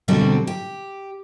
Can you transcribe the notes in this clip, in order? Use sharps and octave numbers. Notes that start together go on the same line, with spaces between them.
B2 D3 F#3 G3 C4
G4